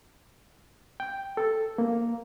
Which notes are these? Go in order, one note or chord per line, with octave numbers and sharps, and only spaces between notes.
G5
A4
A#3